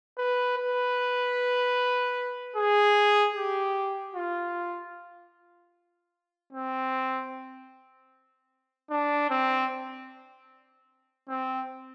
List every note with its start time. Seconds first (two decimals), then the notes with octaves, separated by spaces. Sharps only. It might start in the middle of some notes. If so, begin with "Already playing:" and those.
0.18 B4
0.58 B4
2.56 G#4
3.35 G4
4.15 F4
6.53 C4
8.91 D4
9.30 C4
11.29 C4